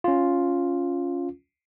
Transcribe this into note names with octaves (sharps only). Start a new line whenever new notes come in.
C#4 F4